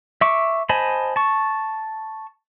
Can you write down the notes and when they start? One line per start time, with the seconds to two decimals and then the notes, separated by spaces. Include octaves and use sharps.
0.21 E5 C#6 D6
0.69 C5 D#5 G#5 A5 B5
1.16 A5 C#6